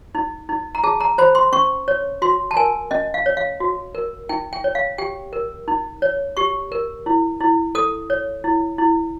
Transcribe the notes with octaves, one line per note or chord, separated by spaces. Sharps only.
D#4
D#4
A#5
G#4 A5
A#5
C5 B5
C6
C#4 C#6
C#5
F#4 C6
A5
A#4 G#5
C#4 D#5
F5
C#5
F5
F#4
A#4
D#4 G5
G5
C#5
F5
G4 G5
A#4
D#4
C#5
G4 C#6
A#4
E4
E4
A4 D#6
C#5
E4
E4